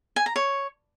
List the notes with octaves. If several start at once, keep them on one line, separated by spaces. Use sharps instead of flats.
G#5
A#5
C#5